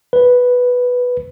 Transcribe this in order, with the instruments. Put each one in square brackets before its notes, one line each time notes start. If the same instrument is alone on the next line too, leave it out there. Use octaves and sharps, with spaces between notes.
[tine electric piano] B4